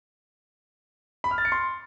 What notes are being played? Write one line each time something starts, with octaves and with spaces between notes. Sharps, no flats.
B5
F6
A6
C#7
C6